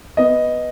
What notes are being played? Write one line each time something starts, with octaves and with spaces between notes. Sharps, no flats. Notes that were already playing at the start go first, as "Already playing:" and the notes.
B3 D#5